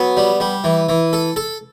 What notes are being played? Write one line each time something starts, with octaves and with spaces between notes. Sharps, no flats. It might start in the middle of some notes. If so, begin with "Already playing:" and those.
Already playing: F#3 B3
G3
G3
E3
E3
A4
A4